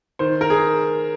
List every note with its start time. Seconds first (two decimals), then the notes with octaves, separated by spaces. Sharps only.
0.19 D#3 C5
0.41 A#4
0.50 G#4